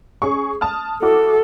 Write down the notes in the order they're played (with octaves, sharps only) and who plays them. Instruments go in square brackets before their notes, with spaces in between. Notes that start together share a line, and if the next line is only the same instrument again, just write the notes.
[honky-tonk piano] C#4 G#4 C#6
A5 D#6 F6
[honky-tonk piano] E4 F#4 D6 [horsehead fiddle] A4